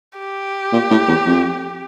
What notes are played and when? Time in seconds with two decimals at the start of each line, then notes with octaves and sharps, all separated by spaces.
0.19 G4
0.73 A#2
0.90 A2
1.08 E2
1.26 F2